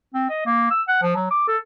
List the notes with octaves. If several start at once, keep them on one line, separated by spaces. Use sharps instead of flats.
C4
D#5
A#3
E6
F#5
F3
F#3
D6
A4